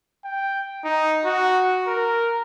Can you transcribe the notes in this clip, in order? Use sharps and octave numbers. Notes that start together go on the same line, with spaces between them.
G5
D#4
F#4
A#4